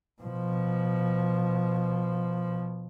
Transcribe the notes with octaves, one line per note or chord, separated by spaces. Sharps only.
B2 F3